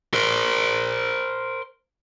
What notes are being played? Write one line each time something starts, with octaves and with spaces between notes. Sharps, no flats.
A#4 C5